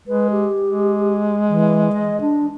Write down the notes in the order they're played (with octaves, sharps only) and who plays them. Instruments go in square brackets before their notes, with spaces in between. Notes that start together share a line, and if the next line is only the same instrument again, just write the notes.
[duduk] G#3 [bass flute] B4
[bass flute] G4
[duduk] G#3
[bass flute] E3
D#5
D4